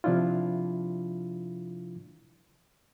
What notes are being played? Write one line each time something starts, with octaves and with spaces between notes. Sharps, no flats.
C3 F3 D4 E4 F4